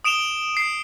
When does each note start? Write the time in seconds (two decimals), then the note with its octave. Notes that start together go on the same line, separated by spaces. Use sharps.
0.04 D#6 D7 E7 F7 G7
0.57 C7